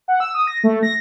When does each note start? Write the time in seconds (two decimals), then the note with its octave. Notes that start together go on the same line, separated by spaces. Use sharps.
0.08 F#5
0.20 E6
0.34 D#6
0.47 A#6
0.64 A3
0.83 A#6